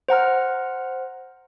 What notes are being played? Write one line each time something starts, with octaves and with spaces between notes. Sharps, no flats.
C5 F#5 A#5 F6